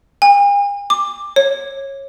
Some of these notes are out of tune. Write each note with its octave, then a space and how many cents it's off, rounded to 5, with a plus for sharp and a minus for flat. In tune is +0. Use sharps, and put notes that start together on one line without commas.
G#5 -45
D6 +10
C#5 -20